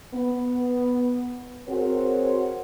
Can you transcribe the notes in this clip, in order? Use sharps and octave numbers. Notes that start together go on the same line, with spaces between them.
B3
C4 F#4 G#4 A#4 C5 C#5